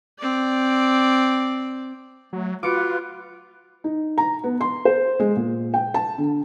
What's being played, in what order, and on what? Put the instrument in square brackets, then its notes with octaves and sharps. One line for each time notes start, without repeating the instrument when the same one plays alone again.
[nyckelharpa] C4 D5
[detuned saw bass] F#3 [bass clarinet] A3
[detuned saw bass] F4 [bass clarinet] F#4 [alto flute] B4 [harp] D6 C#7 D7
[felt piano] D#4
A#5
B3
C6
C5
G#3
A#2
G5
A5
D3